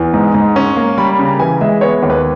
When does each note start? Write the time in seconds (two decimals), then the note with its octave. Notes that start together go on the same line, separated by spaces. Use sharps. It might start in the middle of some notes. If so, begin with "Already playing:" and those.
Already playing: E2
0.14 G#2
0.34 G#2
0.56 C#4
0.77 A#3
0.97 G3 B5
1.19 C#3
1.26 A#5
1.39 E3 G#5
1.61 G#3 E5
1.81 B3 C#5
2.03 D#2
2.10 B4